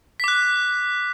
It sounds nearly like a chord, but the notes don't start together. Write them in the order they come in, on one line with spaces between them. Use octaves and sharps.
B6 D6 F#6